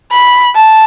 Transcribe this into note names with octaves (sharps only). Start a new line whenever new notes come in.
B5
A5